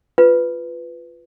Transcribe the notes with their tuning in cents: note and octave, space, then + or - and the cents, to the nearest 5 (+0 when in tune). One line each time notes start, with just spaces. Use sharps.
F4 +0 B4 +10